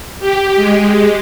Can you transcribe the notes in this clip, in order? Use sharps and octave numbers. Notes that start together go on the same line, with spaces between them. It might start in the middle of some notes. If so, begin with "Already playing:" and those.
G4
G#3